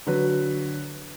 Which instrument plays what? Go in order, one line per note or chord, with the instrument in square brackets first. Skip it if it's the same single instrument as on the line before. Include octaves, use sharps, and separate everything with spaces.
[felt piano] D3 F#3 B4